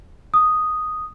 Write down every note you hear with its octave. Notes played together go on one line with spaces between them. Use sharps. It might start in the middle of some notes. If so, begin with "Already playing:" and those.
D#6